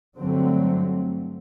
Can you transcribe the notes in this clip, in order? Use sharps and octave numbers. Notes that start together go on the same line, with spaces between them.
G2 D3 F#3 A3 C4